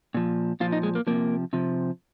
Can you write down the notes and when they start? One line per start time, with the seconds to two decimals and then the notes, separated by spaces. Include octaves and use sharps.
0.14 A#2 F3
0.60 A#2 F3 F4
0.72 D#4
0.83 G#3
0.95 A#3
1.07 C3 F3 A#3
1.53 C3 F3